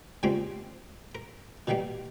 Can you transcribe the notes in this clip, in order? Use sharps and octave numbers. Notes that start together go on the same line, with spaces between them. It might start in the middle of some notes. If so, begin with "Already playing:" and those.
C#3 F3 G3 G#3 A#3 C4
A#4
B2 D#3 E3 G3 A#3